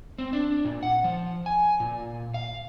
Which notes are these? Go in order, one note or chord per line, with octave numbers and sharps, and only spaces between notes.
C4
D4
A#2
F#5
F3
G#5
A#2
F5